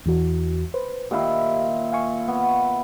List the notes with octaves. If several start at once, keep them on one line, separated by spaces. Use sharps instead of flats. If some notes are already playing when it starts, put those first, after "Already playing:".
E2 E3 F#4
B4 C5
A#2 D#3 E4 G4 F5
F5 G#5 C#6
B3